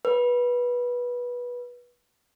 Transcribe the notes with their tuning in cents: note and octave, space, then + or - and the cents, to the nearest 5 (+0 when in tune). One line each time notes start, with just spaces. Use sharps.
B4 -20